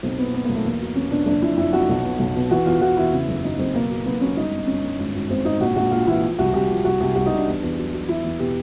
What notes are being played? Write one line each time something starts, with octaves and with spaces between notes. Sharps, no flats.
B1 C4
A#2 B3
A#2 B3
B1 A#3
A3
E2 A#3
F#3
E2 C#4
B2 D4
F#1 D4
F2 E4
F2 E4
F2 F#4
B1
B2
B1
B2
E3 F#4
E2 F4
E3 F#4
E2 E4
C#3
F#1
F#2 D#4
F#1 C4
B2 A#3
F#3
B1 B3
F#3 C#4
G1 D#4
G1
G1 C#4
G1
G#1
G#1
G#1 C4
G#1 D#4
A#1 F#4
A#1 F#4
A#1 F4
E3 E4
F3
C2 F#4
C2 G4
F3
C2 F#4
C2 G4
C2 F#4
C2 D#4
D4
E2
E2
F#3
F#3
E2 E4
E2
B2 G4